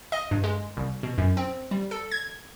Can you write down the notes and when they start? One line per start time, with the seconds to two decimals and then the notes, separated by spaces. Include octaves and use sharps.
0.12 D#5
0.31 G2
0.44 G#3
0.77 C2
1.03 B2
1.18 F#2
1.37 C4
1.71 G3
1.91 A4
2.11 G#6